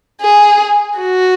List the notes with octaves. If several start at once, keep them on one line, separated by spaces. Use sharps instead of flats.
G#4
F#4